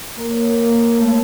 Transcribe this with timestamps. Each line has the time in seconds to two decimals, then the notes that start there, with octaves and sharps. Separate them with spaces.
0.17 A#3 A#4
0.31 C#5
0.44 A#4
0.58 A#3
0.98 A3 C#5